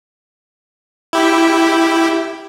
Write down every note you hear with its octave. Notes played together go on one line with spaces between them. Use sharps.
E4 G4